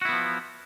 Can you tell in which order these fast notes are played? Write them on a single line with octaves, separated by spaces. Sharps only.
F#4 E4 B3 F3